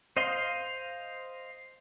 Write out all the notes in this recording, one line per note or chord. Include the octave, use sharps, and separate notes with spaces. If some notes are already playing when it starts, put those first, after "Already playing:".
C5 D#5 F5 C6